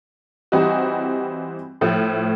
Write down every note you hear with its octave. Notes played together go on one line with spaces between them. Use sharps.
E3 G3 C4 D#4 F#4
A2 F3 A3